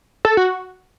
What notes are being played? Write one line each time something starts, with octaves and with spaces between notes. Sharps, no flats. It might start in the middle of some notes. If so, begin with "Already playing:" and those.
A4
F#4